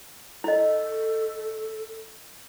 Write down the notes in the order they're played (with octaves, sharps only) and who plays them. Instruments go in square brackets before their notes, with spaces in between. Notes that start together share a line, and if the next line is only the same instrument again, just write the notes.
[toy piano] E4 D#5 [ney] A4